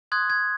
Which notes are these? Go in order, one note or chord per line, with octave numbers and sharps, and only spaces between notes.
C6 D#6 F#6 G#6
G#6